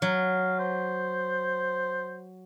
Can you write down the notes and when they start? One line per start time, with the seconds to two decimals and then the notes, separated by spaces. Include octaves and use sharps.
0.02 F#3 F5
0.59 C5